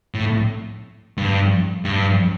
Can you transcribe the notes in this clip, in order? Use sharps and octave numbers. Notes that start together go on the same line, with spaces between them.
A2
G2
G2